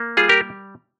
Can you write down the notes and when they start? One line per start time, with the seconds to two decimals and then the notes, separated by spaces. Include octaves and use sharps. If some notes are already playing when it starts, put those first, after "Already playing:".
Already playing: A#3
0.17 G3 F4 G#4
0.29 G4 A#4